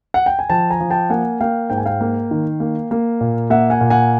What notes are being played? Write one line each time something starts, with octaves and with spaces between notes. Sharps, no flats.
F#5
G5
G#5
F3 G5 A5
G#5 A#5
F3
G5 A5
A#3 F#5 G#5
A#3 F5 G5
G#2 G5
G#5
F5 G5
A#3
D#3
A#3
A#3
A#2
A#3 E5 F#5
F#5 G#5
A#2
F#5 G#5